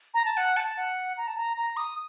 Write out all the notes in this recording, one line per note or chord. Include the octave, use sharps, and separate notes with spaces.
A#5
A5
F#5
A5
F#5
A#5
A5
A#5
A#5
D#6